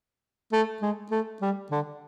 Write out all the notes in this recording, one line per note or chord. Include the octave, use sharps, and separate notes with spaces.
A3
G#3
A3
G3
D3